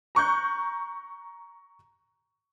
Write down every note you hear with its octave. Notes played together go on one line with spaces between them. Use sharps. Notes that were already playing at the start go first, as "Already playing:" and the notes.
A#5 C#6 F#6 G6